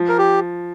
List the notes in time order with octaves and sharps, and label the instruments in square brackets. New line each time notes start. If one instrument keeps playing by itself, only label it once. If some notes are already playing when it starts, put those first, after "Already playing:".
Already playing: [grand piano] F3
[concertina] A#4
G4